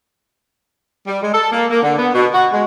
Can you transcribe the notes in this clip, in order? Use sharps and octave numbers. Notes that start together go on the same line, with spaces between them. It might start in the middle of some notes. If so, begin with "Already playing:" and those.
G3
G#3
A4
A#3
A#3
D3
B3
B2
F#4
G#3